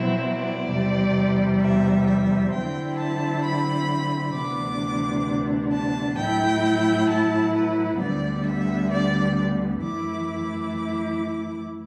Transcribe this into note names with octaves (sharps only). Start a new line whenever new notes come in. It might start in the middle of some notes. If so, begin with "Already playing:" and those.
Already playing: B2 F#3 C4 E4
D5
E2 C3 G3
E5
E5
D3 F#3 C4 E4 G5
A5
B5
D2 C3 E3 B3 D4 D6
A5
A2 F#3 A3 E4 G5
A5
B4
D2 D3 G3 B3 D5
E5
D5
F#2 E3 A3 E4 D6
D6